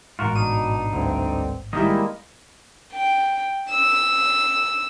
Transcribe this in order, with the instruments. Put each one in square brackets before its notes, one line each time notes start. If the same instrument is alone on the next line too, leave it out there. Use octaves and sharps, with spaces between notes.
[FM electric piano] A1 G#2 [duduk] B2 [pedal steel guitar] F4 F#4 A#4
[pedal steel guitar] D4 D#4 [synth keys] D#7
[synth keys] D2 G2 [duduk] C4
[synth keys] D#3 G3 E4 [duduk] G#3 [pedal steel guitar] A#3 D#5
[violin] G5
E6